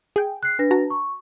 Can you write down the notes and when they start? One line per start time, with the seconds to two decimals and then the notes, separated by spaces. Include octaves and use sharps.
0.16 G#4 G5
0.43 F#6 C7
0.59 D4 B4 A#6
0.71 F#4 A5 A#5
0.90 C#6